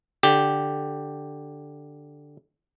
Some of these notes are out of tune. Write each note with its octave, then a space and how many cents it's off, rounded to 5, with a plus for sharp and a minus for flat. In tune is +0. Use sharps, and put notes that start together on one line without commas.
D3 +0 G4 +0